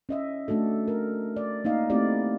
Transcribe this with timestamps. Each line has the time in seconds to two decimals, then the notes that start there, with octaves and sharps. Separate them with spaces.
0.09 C#4 D#5 E5
0.48 A3 D4 F#4 A4
0.88 A#4
1.36 D5
1.65 A#3 D#4 D#5 F5
1.90 A3 B3 C4 E4 G4 D5